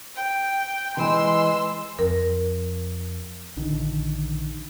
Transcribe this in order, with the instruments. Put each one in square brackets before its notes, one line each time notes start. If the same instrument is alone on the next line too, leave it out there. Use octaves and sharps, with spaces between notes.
[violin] G5
[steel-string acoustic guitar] E3 G#3 [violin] C6 E6
[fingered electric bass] F2 [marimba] A#4
[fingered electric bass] A#1 D3 D#3